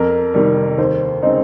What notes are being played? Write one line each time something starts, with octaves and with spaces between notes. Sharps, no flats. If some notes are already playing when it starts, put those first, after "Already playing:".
Already playing: F2 A#4
C3 D#3 G3
D#2 C5
C#3 G#3 C4 D#4 C5